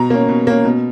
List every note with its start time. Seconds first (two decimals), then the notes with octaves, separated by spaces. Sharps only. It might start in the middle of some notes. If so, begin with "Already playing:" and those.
Already playing: B2 A#5
0.10 A#3 C#4
0.28 B2
0.47 A#3 C#4
0.64 B2